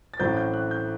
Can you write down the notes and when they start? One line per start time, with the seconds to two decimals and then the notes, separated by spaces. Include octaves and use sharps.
0.14 A6
0.19 A1 A2 F#3 C4 G6
0.37 G6
0.54 F#6
0.71 G6